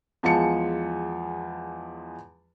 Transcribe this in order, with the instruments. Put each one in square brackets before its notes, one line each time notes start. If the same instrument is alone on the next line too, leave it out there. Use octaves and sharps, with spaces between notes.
[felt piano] E2 F3 G#3 A5 C#7